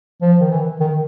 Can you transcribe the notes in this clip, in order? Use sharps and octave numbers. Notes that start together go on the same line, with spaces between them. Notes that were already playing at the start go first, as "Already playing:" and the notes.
F3
D#3
E3
D#3